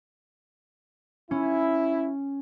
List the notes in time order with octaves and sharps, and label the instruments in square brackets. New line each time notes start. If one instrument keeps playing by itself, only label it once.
[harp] C#4 [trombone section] E4